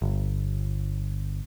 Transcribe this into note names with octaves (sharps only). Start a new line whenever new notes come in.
G1